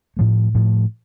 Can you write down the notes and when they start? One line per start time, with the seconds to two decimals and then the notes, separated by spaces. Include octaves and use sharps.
0.17 A2 F3 A3
0.55 A2 F3 A3